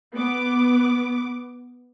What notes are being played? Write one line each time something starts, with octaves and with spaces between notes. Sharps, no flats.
B3 D6